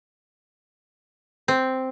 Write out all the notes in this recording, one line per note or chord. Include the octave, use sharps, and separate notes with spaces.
C4